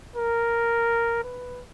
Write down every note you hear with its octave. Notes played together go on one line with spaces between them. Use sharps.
A#4
B4